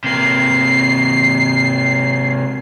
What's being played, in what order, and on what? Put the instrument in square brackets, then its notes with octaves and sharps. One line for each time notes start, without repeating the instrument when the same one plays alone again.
[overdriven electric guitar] C3 A#3 [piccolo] C7